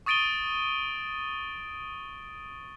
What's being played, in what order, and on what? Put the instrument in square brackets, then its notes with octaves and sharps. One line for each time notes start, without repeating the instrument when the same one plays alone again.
[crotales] C#6 D#6 A6 D7 D#7 G7